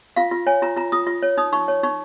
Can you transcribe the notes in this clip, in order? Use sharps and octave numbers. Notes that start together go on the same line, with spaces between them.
F4 F5
F4
C#5 G#5
F4 A#5
F4 A#5
F4 D#6
F4
C#5
D#4 D#6
D#4 C#6
C#5
D#4 C#6